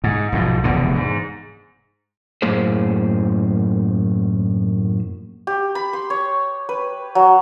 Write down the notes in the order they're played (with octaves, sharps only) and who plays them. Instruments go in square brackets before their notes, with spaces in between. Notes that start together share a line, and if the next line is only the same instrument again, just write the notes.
[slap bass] G#2
B1 G#2 F3
F1 E2 B2 D3
G#2
[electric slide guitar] F#2 A2 A#3 G#4 C5
[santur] G4
B5
C6
C#5
B4
F#3